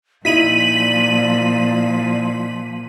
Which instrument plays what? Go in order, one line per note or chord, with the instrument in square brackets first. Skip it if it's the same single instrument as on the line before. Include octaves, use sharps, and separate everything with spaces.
[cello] A#2 F3 [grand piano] D#4 E4 [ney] D5 [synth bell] B6 D#7 F#7